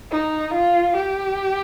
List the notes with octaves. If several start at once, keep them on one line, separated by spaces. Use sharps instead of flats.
D#4
F4
G4